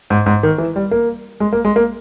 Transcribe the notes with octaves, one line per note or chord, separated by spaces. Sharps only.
G#2
G#2
D#3
E3
G3
A#3
G#3
A#3
G#3
A#3